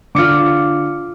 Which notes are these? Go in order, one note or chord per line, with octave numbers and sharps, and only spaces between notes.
D3 F4 D6 C#7